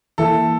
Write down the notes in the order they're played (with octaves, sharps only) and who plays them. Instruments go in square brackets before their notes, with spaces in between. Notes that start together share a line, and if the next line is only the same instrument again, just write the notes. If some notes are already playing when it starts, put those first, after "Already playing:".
[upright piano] E3 A#3 E4 [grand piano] A4